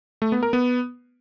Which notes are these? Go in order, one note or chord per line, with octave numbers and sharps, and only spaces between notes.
A3
B3
A#4
B3